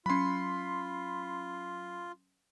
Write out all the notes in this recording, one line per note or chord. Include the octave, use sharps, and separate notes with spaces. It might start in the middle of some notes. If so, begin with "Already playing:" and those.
F#3 C#4 F4 B5 C6